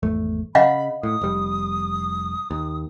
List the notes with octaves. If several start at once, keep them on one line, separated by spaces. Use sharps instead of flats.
G#1 E2 A3
C#3 D#5 F5 F#5 B5
A2 D#6
F1 G3
D#2